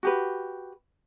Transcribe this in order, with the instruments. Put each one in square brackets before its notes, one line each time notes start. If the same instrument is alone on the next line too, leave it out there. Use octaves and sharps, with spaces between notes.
[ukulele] F#4 G4 B4